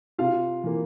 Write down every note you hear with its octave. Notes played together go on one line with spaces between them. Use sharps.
C3 F4 F5
E3 A#3